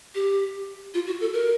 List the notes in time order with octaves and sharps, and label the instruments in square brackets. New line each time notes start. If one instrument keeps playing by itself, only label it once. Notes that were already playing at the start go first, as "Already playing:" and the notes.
[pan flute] G4
F4
F#4
A4
A#4